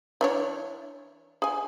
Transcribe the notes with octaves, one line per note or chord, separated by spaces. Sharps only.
E3 D4 C#5
G#4 G#5